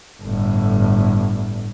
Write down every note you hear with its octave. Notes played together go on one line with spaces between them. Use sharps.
G1 A2